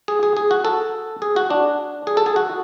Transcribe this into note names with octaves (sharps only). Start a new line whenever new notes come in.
G#4
G#4
G#4
F#4
A4
G#4
F#4
D4
G#4
A4
G#4
F#4